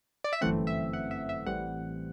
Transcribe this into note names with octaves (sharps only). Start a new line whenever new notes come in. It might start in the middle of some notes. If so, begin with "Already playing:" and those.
D5
E5
G1 F#2 E3 A3 C4 F#5
E5
F#5
E5
E5
A1 A2 E3 G3 C4 F#5